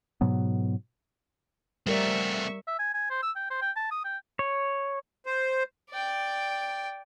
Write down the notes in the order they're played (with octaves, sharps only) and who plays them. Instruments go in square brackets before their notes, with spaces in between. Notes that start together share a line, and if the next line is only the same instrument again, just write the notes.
[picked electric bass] G#2 B2 F#3 B3
[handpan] G3 A#4 D5 [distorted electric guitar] A3 C4 [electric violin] E5 C#6
[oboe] E5
G#5
G#5
C5
E6
G5
C5
G5
A5
D#6
G5
[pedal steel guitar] C#5
[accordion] C5
[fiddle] D5 G5